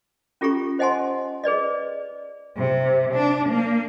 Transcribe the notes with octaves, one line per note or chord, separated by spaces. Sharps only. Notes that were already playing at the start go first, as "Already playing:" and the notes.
C#4 F4 G4 A4 A#5 C#6
C5 D#5 F#5 G#5 A5 C6
G#4 B4 D5 D#5
C3
D4
A#3